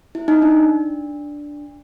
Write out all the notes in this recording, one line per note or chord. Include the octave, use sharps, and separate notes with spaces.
E4
D#4
D4